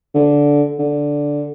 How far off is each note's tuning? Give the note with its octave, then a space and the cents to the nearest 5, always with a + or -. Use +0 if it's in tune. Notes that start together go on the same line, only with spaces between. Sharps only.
D3 -10
D3 -5